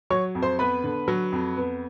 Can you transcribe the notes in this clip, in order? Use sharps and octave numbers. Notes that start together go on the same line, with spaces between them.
F#3 C#5 C#6
F2
C5 C6
B3 B4 B5
D3
F#3
F2
B3